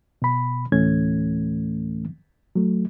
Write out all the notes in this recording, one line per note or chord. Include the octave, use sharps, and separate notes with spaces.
B2 B5
D2 A2 E3 A3 C#4 G#6
F#3 A3